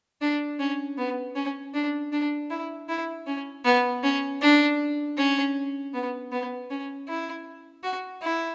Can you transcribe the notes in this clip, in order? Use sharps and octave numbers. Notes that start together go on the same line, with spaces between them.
D4
C#4
B3
C#4
D4
D4
E4
E4
C#4
B3
C#4
D4
C#4
B3
B3
C#4
E4
F#4
E4